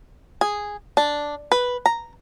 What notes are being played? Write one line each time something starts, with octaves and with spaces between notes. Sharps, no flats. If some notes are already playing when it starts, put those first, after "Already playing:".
G#4
D4
B4
A#5